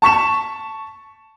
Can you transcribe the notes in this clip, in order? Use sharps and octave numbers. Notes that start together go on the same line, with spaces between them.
A5 C#6 B6 E7